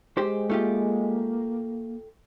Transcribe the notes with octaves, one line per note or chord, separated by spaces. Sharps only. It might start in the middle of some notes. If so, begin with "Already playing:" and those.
G#3 G4 C5
A3 A#3 F4 G4